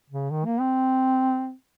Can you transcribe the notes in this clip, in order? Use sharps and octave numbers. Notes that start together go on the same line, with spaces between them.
C#3
D#3
A#3
C4